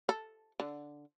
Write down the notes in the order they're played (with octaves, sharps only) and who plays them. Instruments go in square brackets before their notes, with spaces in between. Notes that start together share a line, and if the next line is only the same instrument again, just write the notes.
[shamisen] A4
D3